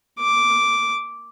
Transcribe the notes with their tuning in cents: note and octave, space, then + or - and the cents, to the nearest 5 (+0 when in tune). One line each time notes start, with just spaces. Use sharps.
D6 -5